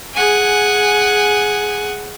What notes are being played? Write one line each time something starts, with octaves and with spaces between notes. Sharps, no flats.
G#4 F#5 G#5